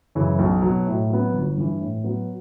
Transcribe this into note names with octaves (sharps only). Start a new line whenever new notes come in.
F#2 C#3 E3
B1
B2 F#3
A2
F#3 B3
G1
G2 E3
A2
F#3 B3